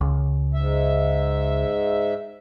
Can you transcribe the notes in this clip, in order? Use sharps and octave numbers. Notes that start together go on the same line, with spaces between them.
C#2
G#2 E5